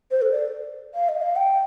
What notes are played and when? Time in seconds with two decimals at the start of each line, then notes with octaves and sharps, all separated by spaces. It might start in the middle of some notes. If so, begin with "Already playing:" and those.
0.11 C5
0.22 A4
0.32 D5
0.95 F5
1.09 D#5
1.22 F5
1.36 G5